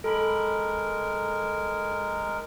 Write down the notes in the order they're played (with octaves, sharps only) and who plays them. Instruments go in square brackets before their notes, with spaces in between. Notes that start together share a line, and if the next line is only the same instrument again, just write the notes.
[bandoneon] G#3 A#4 [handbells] A4 B5